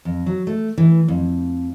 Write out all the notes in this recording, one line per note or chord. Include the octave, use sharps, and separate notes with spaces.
F2
F#3
A3
E3
F2